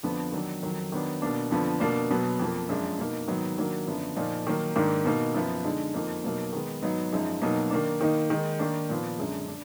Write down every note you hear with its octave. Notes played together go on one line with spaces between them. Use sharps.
F2 D3 F3 B3
D#3 F#3 D4
F2 D#3 F#3
D#3 F#3 B3 D4
B2 A#3 D4
F2 D3 F3 B3
B2 A#3 D4
B2 F#3 B3
F2 F3 A#3
F#2 F3 G#3 D4
B2 A#3 D#4
G#2 D#3 F#3 B3 D#4
D#3 F#3 A#3 D4
F#2 D3 F3 B3
A#2 F3 A#3 D#4
D#3 F#3 A#3
G#2 D#3 A#3 D4
B2 A#3 D#4
F#2 F3 B3
D3 G#3 D#4
F2 F3 A#3 D#4
B2 F#3 A#3 D#4
D#3 G#3 B3
G#2 F#3 B3 D#4
F#2 F3 G#3 D#4
B2 F#3 A#3 D#4
D#3 A#3 D4
D#3 A#3 D#4
D#3 G#3 D#4
D#3 A#3 D4
A#2 F3 B3
F#2 D3 G#3
D4